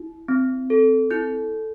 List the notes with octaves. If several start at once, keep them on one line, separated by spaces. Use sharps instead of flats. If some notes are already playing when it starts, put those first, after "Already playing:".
Already playing: E4
C4
A4
E4 G6